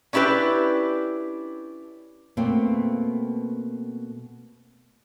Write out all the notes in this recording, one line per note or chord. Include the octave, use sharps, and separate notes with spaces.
C#4 D4 E4 G4 B4
B2 A3 A#3 C4